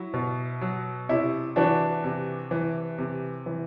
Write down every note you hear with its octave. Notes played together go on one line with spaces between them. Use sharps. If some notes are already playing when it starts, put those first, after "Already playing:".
Already playing: F#3 E4
B2
F#3
C3 E4
E3 D4 F#4
C3
E3
C3
E3